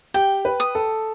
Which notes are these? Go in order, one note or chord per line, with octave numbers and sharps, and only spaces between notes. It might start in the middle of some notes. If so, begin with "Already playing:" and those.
G4 G5
B4
D#6
A4